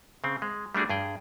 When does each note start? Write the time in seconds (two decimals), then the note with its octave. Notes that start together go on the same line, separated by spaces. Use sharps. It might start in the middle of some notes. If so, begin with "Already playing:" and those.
0.24 C#3 C4
0.42 G#3
0.75 G3 A3 D4 F#4 G#4
0.90 G2 G#4 G5